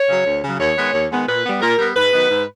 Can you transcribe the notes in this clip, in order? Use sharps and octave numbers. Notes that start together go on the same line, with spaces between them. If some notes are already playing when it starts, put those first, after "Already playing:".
Already playing: C#5
C#3 F#3
D2
C#3 F#3
D#2 C#5
D#3 G#3 B3
D#2
D#3 G#3 B3
A#2 B4
G3 B3
A#2 A#4
G3 B3
G#2 B4
D#3 F#3 B3
G#2